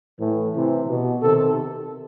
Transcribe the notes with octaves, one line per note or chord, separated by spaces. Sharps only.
A2 E3
C3 E3
B2
C3 D#3 A4